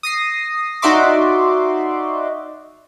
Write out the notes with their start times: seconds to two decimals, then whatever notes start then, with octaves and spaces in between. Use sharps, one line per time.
0.03 D#6 A#6 C7
0.82 D#4 F#4 D5 E5 C6 D6